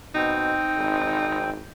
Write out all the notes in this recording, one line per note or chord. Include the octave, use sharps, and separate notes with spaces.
B2 C4 D#4 G5
G#1